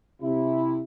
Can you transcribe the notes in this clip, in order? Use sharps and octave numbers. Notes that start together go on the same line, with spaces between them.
C3 E4